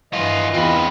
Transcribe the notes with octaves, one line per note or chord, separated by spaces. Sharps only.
G2 D#3 E3 F4 D#5
E2 C4 F4 B4